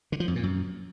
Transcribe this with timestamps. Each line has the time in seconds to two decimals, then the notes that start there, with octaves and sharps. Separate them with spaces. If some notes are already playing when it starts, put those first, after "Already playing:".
0.12 D3
0.20 F3
0.28 F2
0.36 A#2
0.43 F#2